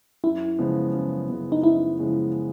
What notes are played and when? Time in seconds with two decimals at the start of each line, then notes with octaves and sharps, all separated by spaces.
0.24 F#2 E4
0.58 C#3 F3 G#3 B3
0.94 F#2
1.28 C#3 F3 G#3 B3
1.52 D#4
1.63 F#2 E4
1.99 C#3 F3 G#3 B3